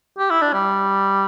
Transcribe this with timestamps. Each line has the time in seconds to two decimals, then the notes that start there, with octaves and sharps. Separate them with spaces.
0.18 G4
0.30 E4
0.41 D4
0.53 G3